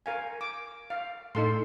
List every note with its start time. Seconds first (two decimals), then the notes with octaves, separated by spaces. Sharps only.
0.06 A#4 F5 G#5
0.41 D6
0.90 F5
1.35 A2 D#4 A4 C6